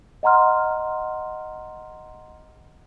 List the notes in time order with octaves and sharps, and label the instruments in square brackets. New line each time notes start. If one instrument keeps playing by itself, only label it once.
[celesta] D#5 F#5 A#5 C6 F6